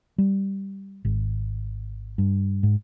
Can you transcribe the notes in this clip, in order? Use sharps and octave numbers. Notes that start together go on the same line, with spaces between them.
G3
G#1
G2
G#2